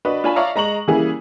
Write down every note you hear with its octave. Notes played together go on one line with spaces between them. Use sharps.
D4 F#4 B4 D#5
D4 F4 C#5 G#5 A5 B5
C#5 D5 E5 F5 A#5 C#6
G#3 A#5 C#6 F#7
C#3 E3 G3 A#3 E4 G#4